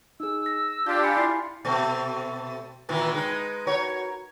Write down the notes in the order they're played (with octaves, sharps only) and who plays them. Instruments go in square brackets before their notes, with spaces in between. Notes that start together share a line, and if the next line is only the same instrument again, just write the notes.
[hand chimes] D#4 G#4 [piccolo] E6
[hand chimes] A#6
[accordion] D4 F4 G4 [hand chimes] G6
[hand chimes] G#5 B5 C#7
E4 C6 C7
[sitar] B2 A3 C4
A#2 D#3 E3
G#3 D#4 B4
F#4 A#4 C#5